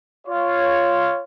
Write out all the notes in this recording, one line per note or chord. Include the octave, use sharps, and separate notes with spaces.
F4 C#5